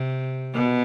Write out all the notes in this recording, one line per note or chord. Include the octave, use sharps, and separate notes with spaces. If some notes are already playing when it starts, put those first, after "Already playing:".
Already playing: C3
B2